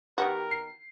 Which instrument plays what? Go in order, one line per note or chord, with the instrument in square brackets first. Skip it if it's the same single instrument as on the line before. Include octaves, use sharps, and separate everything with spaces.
[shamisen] D#3 B3 F#4 [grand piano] G4 [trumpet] A#4
[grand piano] C7